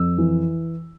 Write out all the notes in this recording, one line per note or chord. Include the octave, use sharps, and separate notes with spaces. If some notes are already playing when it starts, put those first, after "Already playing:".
Already playing: F2 E6
E3